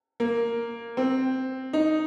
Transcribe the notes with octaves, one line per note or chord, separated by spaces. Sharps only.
A#3
C4
D#4